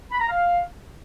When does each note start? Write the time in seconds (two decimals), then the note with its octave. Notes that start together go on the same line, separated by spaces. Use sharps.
0.11 B5
0.19 A#5
0.28 F5